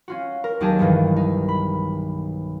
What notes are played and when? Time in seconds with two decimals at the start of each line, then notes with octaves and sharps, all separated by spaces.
0.08 C#4 F4 F#4
0.44 A#4
0.60 D#2 F#3 D#4 G4 G#4 A5
0.79 B1 G2 D#3 E3
1.16 D#4
1.48 B5